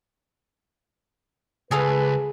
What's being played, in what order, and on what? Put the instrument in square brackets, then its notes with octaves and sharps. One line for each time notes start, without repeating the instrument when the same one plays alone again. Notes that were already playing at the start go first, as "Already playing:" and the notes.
[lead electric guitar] C#2 [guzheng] G#4 A4 F5 [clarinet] B4